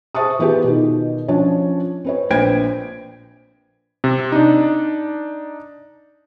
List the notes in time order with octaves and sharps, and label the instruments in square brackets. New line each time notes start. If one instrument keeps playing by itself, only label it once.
[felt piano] G#4 C5 E5 A5 C#6 D#6
E3 B3 F4 G4 G#4
B2 D#3
F3 C#4 D4 C#5
C4 B4 C#5
A#1 B4 C5 G5 G#6 D7
[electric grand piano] C3
D4 D#4